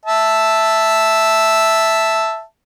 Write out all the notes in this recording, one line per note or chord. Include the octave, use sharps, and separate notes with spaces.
E5 A5